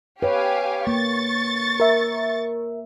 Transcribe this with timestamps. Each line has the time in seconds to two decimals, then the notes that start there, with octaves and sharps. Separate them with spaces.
0.22 G4 B4 C#5 F5 G#5
0.87 A#3 C#6 A6
1.80 A#4 E5